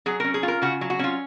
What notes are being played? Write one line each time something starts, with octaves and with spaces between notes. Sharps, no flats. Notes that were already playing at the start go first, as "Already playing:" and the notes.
F#3 G#4
C#4 A#4
G#4
F4
A#4
C#3 F#4
F#3
F#4
C#4 F4